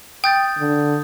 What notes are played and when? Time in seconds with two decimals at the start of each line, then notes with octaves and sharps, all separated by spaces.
0.24 G5 D#6 G6 A6
0.58 D3